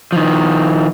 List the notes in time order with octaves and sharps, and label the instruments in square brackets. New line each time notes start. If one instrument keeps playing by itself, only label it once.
[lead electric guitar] D#3 F3